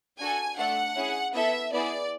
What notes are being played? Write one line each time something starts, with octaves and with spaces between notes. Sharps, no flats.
D4 F#4 A4 G#5
A3 D4 A4 F#5
C#4 E4 G#4
B3 E4 A4 E5
B3 E4 G#4 D5